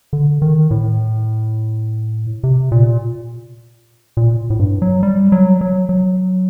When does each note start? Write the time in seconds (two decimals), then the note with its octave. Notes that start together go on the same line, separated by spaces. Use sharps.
0.13 D3
0.42 D#3
0.71 A2
2.43 C3
2.72 A#2
4.17 A#2
4.50 A2
4.59 G2
4.82 F#3
5.03 G3
5.32 F#3
5.61 F#3
5.89 F#3